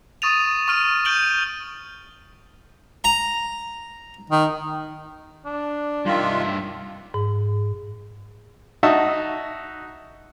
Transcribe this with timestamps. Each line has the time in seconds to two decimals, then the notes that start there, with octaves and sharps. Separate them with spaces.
0.22 C#6 D#6 A6 D#7 F7
0.68 C#6 F6 D#7
1.05 G6 D7 D#7 F#7 G7
3.04 A#5
4.30 D#3
5.45 D4
6.05 G2 D#3 F4 E5
7.14 G#2
8.83 D#4 F#4 E5 F#5 A5 D#6